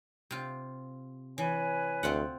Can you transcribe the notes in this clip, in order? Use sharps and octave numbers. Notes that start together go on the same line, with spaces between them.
C3 F4
E3 B4 C#5 G#5
D2 C4 F4 F#5